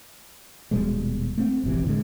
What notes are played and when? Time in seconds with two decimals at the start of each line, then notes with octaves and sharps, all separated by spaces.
0.71 D#1 B2 G3 G#3
1.38 A3 C4
1.64 E1 A1 C3 E3
1.84 A2 D3 G#3